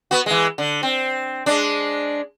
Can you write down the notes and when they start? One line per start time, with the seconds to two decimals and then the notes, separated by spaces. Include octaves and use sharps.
0.11 B3 F#4
0.26 E3 G#3
0.58 D3
0.83 C4
1.46 G#3 D4